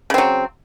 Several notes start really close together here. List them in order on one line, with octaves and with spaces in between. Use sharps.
C#3 C4 F#3